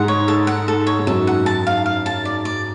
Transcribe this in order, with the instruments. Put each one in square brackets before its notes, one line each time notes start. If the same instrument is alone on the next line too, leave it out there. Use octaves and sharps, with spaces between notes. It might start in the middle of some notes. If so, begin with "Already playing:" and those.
Already playing: [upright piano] G#2 G#3 [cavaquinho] F#5
[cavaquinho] C#5
A4
F#5
A4
C#5
[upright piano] G#3
[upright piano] F#2 F#3 [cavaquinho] A4
[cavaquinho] F#5
A5
F5
F5
A5
D5
D5